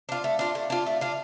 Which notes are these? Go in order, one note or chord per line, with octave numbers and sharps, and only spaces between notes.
D4 F4
A3
D4 F4
A3
D4 F4
A3
D4 F4